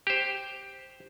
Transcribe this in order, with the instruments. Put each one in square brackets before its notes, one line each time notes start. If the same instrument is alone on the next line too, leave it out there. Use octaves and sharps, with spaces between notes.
[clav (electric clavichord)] G4 C5